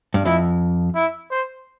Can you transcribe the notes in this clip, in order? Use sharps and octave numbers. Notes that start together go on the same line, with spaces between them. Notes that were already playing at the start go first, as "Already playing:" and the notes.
G2
F2 E4
E4
C5